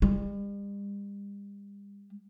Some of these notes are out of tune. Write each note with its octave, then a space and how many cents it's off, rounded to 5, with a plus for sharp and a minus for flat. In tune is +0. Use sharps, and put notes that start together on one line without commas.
G3 +45